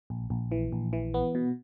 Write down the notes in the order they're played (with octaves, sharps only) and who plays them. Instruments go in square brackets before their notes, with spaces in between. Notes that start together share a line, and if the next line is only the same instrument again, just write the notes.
[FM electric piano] A#1
A#1
E3
A#1
E3
B3
B2